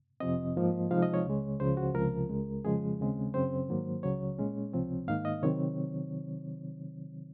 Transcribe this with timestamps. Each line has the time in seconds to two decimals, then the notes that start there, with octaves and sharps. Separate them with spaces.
0.20 F2 C3 F3 C4 D#5
0.56 G#2 F3 A#3
0.91 C3 F3 G#3 D#4 F5
1.02 D#5
1.14 C#5
1.25 C#2 C#3 G#3
1.60 C#2 C#3 F3 C5
1.77 F#4
1.95 C#2 C3 F3 A#4
2.30 C#2 C#3 G#3
2.65 F2 C#3 F3 G#3 G#4
3.00 D#2 C#3 G#3 C4
3.34 F#2 C#3 F#3 C4 C5
3.69 G#2 D#3 F#3 A#3
4.03 C#2 C#3 F#3 C#5
4.39 A#2 G#3 C#4
4.74 C#2 C3 F3 C4
5.08 G#2 D#3 A#3 D#4 F5
5.25 D#5
5.43 C3 D#3 F#3 C4 C#5